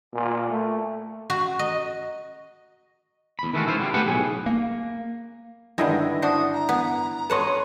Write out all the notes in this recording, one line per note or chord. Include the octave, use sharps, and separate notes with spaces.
A#2
A3
F#4
D#5
E2 B5
D#3 E3 G#3 A3 F4 F#4
C#2 E4 F4 A4 C5
D3 G3 G4
A3 G4 B4 C5 F#5
B1 A2 G#4
A#3
G2 D3 D#3 G#3 E4 A#6
D4 F#4 C5 D#6
A#5
B3
B4 C#5 D#5 F#5 A5 C6